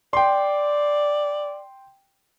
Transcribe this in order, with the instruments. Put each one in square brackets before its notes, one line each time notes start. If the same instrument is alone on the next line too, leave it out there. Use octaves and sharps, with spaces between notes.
[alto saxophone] D5 [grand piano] G5 C6